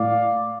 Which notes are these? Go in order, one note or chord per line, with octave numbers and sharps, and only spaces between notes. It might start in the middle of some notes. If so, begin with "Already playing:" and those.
Already playing: A2 D5 F5